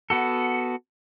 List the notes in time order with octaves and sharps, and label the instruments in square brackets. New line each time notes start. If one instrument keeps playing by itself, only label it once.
[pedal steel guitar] B3 F#4 A4